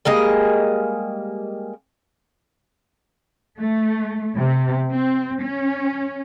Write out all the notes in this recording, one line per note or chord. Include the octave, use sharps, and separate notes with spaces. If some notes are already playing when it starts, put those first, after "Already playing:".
G3 G#3 A#3 D#5
A3
C3
C4
C#4